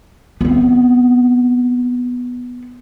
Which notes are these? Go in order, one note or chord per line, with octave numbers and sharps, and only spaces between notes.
B3 C4